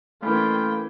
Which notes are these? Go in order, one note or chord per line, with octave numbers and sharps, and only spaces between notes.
E3 A3 A#3 C#4 F4 A4 G5 B5